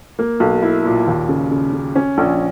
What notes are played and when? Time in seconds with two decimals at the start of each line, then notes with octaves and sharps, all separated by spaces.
0.19 A#3
0.40 B1
0.62 E4
0.85 A#2
1.07 D#2
1.29 C#3
1.51 C#3
1.73 C#3
1.95 C#4
2.18 A#1